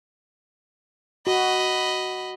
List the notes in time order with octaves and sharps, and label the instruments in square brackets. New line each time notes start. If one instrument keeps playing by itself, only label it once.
[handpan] F#4 [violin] D#5 B5